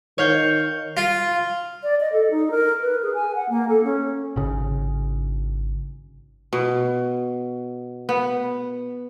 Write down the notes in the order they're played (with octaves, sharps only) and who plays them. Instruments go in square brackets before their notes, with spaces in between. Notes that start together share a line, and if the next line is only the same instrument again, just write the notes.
[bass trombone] D#3 [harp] C#5 F5 G6
[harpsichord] F4
[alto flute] D5
D#5
A4
D#4
A#4
B4
G#4
G#5
F#5
A#3
A4
C#4
[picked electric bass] G#1 C#3
[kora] B2
B3